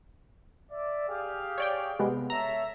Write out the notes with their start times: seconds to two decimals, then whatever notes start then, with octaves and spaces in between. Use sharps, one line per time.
0.71 D5 E5
1.08 G4 G#4 F5
1.58 C#5 D5 G5
1.99 C3 G#3 B3
2.30 A4 C#5 E5 A#5